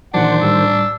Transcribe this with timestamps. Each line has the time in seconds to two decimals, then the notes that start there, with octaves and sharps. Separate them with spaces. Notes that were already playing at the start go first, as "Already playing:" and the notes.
0.14 A#2 D#3 E3 F#3 D4 C5 F#5
0.42 A2 G3 E6